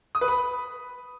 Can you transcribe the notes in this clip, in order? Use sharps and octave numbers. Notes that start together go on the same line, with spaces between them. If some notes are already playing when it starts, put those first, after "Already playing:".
D#6
B4
B5